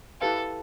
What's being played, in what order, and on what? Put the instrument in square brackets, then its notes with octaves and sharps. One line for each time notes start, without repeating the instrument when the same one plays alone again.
[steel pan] E4 G4 B4 F5 [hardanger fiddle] A4